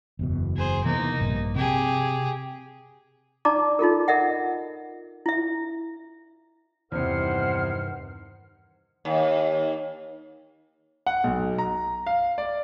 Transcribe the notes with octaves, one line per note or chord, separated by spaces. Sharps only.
F#1 E2 B2
G#4 C5
C3 E3 A#3 B3 D#4
A#1 G2
C3 G4 G#4
D#4 D5 A5 A#5 D6
D#4 F4 A4 A#4
A#4 D#5 E5 F#5
E4 E5
E2 G2 C3 D#3 C5 F#5 F6
D#2
F#5
B1
A#5
F5
D5